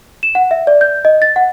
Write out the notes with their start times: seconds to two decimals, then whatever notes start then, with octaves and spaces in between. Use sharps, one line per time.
0.23 E7
0.35 F#5
0.51 E5
0.67 D5
0.81 G6
1.05 D#5
1.22 A6
1.36 F#5